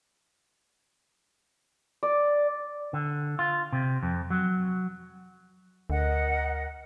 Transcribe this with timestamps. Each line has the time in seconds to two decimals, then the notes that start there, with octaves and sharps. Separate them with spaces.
2.03 D5
2.93 D3
3.39 F4
3.72 C3
4.03 F2
4.30 F#3
5.90 D2 A#4 D#5 F#5